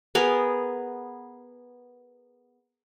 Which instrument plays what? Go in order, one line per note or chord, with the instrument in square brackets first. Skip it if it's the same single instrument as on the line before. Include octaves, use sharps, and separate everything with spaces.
[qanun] B3 G#4 A#4